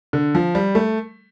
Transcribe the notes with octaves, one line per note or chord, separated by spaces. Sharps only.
D3
F3
G3
A3